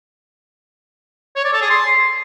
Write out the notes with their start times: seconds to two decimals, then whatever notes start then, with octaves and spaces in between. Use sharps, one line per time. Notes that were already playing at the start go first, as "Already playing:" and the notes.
1.36 C#5
1.44 D5
1.53 A4
1.62 G#4
1.70 C6